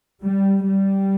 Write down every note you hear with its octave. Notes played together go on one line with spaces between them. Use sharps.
G3
G3